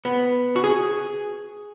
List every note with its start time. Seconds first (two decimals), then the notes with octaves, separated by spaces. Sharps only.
0.05 B3
0.56 F#4
0.64 G#4